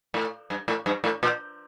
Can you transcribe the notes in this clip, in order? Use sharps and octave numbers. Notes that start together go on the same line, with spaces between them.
A2
G2
A2
G2
A2
A#2